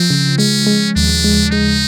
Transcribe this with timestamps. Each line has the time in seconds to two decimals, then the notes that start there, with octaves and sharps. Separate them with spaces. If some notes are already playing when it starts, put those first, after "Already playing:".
Already playing: F3 C4
0.10 C#3
0.38 G#3 C#4
0.67 G#3
0.96 D#2 D4
1.24 G#3
1.52 G#3 D#4